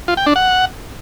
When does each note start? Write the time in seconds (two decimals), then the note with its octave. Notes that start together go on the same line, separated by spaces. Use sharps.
0.08 F4
0.17 G5
0.26 D4
0.36 F#5